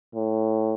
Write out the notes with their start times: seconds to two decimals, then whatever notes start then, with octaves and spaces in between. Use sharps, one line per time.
0.15 A2